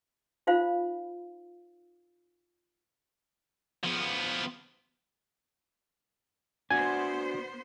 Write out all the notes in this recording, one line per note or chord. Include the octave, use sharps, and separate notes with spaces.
D#4 F4 C5 F5 B5
F3 B3
B3 D4 F#4 C5 G#5